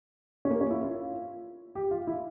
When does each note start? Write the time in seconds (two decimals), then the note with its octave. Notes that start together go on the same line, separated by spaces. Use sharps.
0.45 C#4
0.50 A#3
0.61 C#4
0.71 E4
0.82 F4
1.75 G4
1.91 F4
2.07 E4